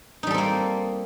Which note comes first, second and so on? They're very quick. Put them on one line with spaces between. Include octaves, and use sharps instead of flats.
D#4 G3 A4 C4 A#3